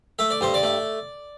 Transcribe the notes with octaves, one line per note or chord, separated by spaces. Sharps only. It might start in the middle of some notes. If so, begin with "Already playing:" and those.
A3 E5
D5
G2 C5
D5
A3